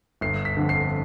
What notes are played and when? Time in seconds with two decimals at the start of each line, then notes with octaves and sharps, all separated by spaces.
0.21 G1 C7
0.45 B6
0.57 F2 D3
0.69 C7